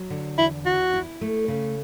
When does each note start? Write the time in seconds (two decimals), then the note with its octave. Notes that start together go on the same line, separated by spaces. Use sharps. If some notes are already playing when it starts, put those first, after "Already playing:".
Already playing: F#3
0.10 D3
0.38 E2 E4
0.65 E4 F#4
0.93 E4
1.21 A3
1.48 C#3